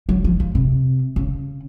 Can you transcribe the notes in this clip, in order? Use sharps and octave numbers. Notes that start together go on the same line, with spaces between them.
F#3
F3
F3
C3
C#3